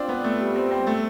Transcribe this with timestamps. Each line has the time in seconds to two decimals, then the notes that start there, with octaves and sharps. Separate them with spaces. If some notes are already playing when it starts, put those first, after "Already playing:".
Already playing: C4 D4 F4
0.08 B3
0.24 A3
0.40 G3
0.55 C4
0.71 C4
0.87 A3